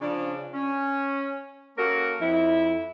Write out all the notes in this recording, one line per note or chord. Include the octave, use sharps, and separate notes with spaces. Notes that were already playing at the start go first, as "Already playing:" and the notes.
C#3 F3 D4
C#4
A#3 C#4 F#4 A4 A#4 F5
F2 E4